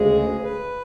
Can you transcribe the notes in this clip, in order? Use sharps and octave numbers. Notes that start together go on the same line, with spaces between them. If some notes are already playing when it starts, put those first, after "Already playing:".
Already playing: D2 C#3 G#3 G#4
B4